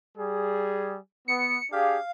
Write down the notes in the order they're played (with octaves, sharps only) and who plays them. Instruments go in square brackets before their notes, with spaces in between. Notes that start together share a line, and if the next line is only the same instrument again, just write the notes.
[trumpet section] G3 G#4
[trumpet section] B3 [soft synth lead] C#7
[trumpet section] D4 G4 G#4 [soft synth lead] F5